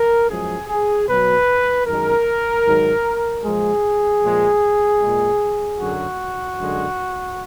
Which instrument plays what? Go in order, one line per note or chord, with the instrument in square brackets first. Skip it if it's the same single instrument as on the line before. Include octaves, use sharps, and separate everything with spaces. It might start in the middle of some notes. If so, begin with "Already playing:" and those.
Already playing: [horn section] A#4
F#2 F3 G#3 G#4
G#4
B2 F#3 B4
F#2 D#3 G#3 A#4
G#2 D#3 F#3
A#2 F3 G#3 G#4
A#2 F3 G#3
A#2 G#3
F#2 D3 F#3 F#4
F#2 D3 G#3